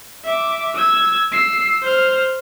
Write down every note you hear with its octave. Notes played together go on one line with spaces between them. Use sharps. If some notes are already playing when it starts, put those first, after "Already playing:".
E5 D6
E6 G#6
E6 C7
C5 F6